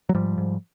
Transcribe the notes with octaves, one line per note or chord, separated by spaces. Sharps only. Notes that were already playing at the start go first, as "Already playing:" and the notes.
F#3
G#2 F3 G3
G#2